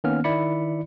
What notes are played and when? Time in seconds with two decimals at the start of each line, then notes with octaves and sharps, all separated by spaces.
0.04 D#3 A#3 B3 C#4 F6
0.24 D#3 E4 D5 B5 C#7